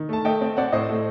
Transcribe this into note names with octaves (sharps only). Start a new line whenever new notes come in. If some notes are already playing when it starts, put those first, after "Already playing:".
Already playing: D#3
A3 A5
A3 D#5 G5
C4
C4 D5 F#5
A2 C5 D#5
A3